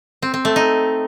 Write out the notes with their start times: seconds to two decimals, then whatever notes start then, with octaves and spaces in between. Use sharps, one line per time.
0.22 C4
0.34 C4
0.45 A3
0.56 D#4